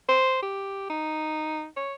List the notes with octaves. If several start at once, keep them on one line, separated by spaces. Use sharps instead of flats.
C5
G4
D#4
C#5